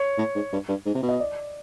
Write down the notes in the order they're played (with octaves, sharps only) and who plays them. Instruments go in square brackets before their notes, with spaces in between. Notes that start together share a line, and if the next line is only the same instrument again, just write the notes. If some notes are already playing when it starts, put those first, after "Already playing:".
Already playing: [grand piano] C#5
[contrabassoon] A2
G#2
G2
G2
G#2
C3
B2
[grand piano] D#5
D5